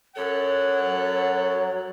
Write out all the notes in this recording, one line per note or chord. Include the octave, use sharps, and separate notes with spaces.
F#2 A4 C#5 F#5
F#3